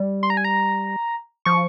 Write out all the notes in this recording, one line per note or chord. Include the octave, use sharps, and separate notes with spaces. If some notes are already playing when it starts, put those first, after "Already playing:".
Already playing: G3
C6
A#5
G#5
A#5
F3 C#6